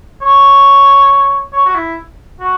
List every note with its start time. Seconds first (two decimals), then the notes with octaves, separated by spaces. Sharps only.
0.21 C#5
1.52 C#5
1.65 F#4
1.74 E4
2.40 F#4